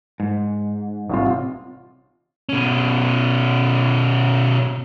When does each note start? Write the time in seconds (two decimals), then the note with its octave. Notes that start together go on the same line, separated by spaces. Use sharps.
0.20 G#2
1.10 A1 C3 F4
2.49 B2 C#4